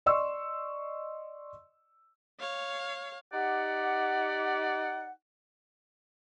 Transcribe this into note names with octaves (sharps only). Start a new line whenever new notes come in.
D5 D#5 C6 C#6 E6
C#5 F5
D#4 G4 D5 F#5